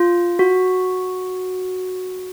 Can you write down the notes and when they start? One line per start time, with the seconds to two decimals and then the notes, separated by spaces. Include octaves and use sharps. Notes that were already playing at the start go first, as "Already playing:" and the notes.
Already playing: F4
0.39 F#4